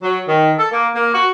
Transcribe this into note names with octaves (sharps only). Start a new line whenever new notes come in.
F#3
D#3
A4
A#3
A#3
F#4